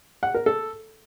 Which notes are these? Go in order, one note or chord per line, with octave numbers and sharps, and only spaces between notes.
F#5
A#4
A4